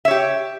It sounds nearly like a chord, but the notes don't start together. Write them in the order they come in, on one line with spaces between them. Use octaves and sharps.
E5 C#5 G4